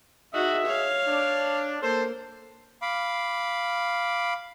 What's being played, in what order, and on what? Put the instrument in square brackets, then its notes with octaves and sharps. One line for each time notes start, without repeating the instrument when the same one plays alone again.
[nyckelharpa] D#4 F#4 [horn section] G#4 D#5 E5
[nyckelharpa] C#5 F5
[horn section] D4
[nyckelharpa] A#3 [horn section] A4 C5
[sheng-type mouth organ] F5 B5 D6